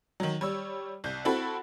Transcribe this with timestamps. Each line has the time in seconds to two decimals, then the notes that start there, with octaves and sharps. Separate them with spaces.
0.20 D#3 F#3
0.41 G3 C#5 E6
1.04 C2 G6
1.25 C4 E4 F#4 A4 B5